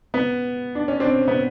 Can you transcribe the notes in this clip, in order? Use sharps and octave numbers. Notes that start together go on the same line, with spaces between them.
B3
D4
C#4
C4 D4
B3